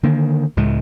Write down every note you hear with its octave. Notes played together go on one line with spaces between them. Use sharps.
D3 D#3 A#3
C#2 A2 G#3 A3